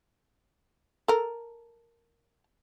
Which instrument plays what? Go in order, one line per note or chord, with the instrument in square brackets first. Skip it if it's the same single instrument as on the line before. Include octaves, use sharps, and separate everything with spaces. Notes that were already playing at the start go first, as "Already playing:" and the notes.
[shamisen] A4 A#4